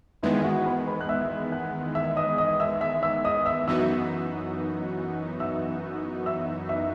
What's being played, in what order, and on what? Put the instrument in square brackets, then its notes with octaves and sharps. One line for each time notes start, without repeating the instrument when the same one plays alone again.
[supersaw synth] E2 D#3 G#3 B3 [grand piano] E4 E5
[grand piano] E5
F#4 F#5
B4 B5
B4 B5
F#6
E5 E6
F#5 F#6
E5 E6
D#5 D#6
D#5 D#6
E5 E6
E5 E6
E5 E6
D#5 D#6
E5 E6
[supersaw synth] F#2 E3 B3 D#4 F#4 [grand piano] E5 E6
[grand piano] E5 E6
E5 E6
E5 E6